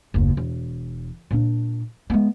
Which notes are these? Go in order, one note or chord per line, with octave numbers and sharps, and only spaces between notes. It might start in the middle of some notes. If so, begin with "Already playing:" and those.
F#1 D#2
E1
A#2 D4
G#3 B3